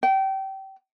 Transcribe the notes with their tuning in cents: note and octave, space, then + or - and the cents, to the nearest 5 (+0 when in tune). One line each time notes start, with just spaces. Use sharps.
G5 -25